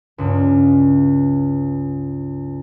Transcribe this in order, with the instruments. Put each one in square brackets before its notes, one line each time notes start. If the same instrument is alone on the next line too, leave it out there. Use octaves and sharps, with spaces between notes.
[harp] C#2 G2